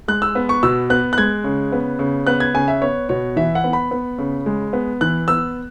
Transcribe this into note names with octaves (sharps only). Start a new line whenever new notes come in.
G#3 F#6
E6
B3
C#6
B2 E6
B3 F#6
F#6
G#3 G#6
C#3
B3
C#3
B3 F#6
G#6
C#3 G#5
E5
B3 C#5
B2 C#5
E3 E5
F#5
B3
B5
B3
C#3
G#3
B3
E3 F#6
B3 E6